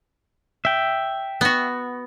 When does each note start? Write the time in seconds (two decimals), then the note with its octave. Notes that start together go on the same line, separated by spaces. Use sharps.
0.65 E5 G5
1.41 B3 F#4